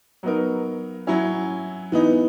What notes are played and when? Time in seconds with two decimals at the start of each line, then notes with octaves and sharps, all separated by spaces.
0.23 F#3 B3 D#4 A#4
1.07 F#3 C#4 E4
1.92 E3 B3 D#4